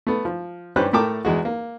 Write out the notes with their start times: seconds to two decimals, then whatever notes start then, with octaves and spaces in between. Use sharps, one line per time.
0.07 A3 B3
0.25 F3
0.76 G2 C#4 G4 B4 C5 F#6
0.93 A2 A3 A#4 G5 A5 D6
1.25 E2 G#3 F#4
1.45 A#3